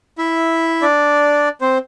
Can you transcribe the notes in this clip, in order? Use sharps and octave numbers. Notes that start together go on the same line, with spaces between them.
E4 E5
D4 D5
C4 C5